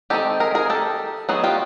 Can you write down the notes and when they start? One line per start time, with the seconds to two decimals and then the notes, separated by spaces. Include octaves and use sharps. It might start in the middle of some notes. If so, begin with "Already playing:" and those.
0.10 D#3 G#3 C4 D#4 G4 A4
0.40 G#4 A#4
0.55 G#4 A#4
0.70 G4 A4
1.29 F#3 B3 D#4 F#4 G#4
1.44 F4 G4